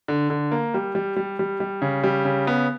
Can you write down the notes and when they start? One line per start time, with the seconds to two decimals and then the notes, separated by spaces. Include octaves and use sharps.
0.08 D3
0.30 D3
0.52 A#3
0.74 G3
0.95 G3
1.16 G3
1.39 G3
1.60 G3
1.82 C#3
2.04 G3
2.25 C#3
2.47 B3